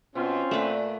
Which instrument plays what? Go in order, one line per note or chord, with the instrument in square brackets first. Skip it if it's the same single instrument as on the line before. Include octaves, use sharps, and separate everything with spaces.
[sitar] B2 [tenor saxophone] C4 [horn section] C#4 F4
[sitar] A#2 [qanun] A3 B4